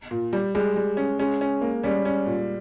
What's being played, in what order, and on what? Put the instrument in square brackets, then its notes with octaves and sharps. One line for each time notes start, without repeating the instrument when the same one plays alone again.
[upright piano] A#2
G3
[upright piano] G3 [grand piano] G#3
[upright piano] G3
C#4
[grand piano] G#3 [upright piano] C#4
[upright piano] C#4
A#3
[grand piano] G3 [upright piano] C#4
[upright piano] C#4
A#2